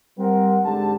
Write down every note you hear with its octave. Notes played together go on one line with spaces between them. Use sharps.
G3 C4 A#4 F#5
G#2 D3 G4 A5